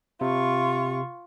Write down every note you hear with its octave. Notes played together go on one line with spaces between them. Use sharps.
C3 F4 C#6